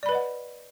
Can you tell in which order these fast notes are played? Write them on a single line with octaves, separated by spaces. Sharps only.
D5 B5 B4 D#5 F#5